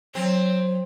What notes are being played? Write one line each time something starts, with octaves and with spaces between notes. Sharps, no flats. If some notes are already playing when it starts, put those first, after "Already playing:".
F#3 C4